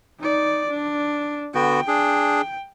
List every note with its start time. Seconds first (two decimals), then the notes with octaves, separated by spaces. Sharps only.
0.19 D#4 D5
0.71 D4
1.55 D3 B3 F#4 G5
1.88 D4 G#4